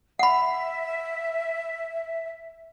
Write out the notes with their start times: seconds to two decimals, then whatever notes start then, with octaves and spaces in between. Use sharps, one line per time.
0.19 E5 F#5 B5